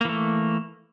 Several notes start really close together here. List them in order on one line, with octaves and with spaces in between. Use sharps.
A#3 E3 A3